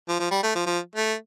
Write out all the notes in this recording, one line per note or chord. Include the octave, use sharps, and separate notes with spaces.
F3
F3
G3
A3
F3
F3
A3